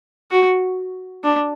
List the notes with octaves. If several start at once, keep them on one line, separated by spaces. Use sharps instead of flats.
F#4
D4